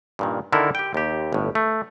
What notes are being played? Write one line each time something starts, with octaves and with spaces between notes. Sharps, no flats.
G2 A#2 D#3
D3 D#3 E4 A4 A#4
G4 G5
D#2 G4
G1 A2
A3